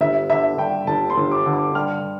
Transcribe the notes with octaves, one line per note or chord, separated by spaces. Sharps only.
G1 E5
D3 E5
G2 G5
G1 A5
C6
G1
D6
D3
D6
G2 F6